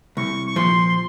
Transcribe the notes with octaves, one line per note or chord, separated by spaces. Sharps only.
C2 C#6
C#6
A#2 F3 C6
C6